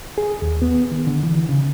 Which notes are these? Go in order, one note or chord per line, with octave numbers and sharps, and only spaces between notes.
G#4
D#2
B3
D#3
D3
E3
C#3